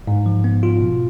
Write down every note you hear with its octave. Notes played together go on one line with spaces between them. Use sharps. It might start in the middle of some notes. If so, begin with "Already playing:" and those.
G#2
F3
B3
F4
B2